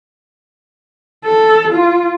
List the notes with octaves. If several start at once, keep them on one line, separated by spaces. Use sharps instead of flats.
A4
F4